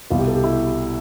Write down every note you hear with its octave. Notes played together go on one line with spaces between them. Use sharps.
C2 B2 F4
G4
A4
G4
E4